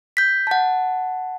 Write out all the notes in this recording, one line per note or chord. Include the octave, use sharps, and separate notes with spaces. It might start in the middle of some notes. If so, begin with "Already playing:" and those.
G6 B6
F#5 A5